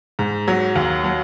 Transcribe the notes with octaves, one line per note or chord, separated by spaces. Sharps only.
G#2
F#3
D#2
F#3